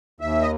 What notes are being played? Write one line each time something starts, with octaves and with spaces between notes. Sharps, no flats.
D#2 E5
D#5